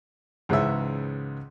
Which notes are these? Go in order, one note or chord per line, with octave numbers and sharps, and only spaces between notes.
C#2 G#2 C#3 E3 C#5 E5